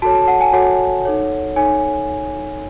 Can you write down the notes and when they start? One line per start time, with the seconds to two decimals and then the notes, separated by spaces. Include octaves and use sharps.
0.02 F#4 A4 C#5 A5
0.15 A5
0.28 F#5
0.41 G#5
0.53 F#4 A4 C#5 F#5
1.05 D#4 A4 C#5
1.56 D#4 A4 C#5 G#5